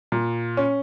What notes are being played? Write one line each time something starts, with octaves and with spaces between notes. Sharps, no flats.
A#2
C#4